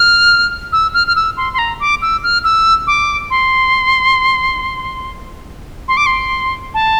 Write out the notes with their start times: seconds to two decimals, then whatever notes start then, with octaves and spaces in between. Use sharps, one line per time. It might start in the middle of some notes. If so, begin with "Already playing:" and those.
Already playing: F6
0.72 E6
0.94 F6
1.07 F6
1.16 E6
1.37 C6
1.53 C6
1.58 A#5
1.80 D6
2.02 E6
2.23 F6
2.44 E6
2.87 D6
3.30 C6
5.88 C6
5.97 D6
6.06 C6
6.74 A5